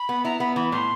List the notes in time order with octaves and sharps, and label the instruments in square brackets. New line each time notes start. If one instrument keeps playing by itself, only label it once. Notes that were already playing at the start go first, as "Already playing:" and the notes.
Already playing: [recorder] B5
[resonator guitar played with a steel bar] B3
[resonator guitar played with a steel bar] E4 [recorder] A#5
[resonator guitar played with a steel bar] B3 [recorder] B5
[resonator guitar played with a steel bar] E3 [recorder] B5
[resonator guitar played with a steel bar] A2 [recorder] C6